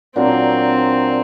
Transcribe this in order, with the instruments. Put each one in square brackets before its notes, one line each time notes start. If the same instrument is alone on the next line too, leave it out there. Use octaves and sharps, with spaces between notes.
[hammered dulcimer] A#2 F#3 A#3 D4 [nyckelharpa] C4